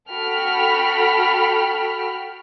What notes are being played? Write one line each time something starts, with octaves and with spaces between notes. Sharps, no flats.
F#4 A4 G5 B5 F6